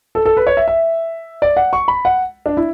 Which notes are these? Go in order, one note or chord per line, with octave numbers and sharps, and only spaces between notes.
A4
A4
B4
C#5
E5
E5
D5
F#5
C#6
B5
F#5
D4
E4